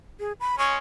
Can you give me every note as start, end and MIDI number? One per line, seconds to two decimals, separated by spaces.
0.20 0.33 68
0.40 0.56 83
0.59 0.78 56
0.59 0.78 61
0.59 0.77 85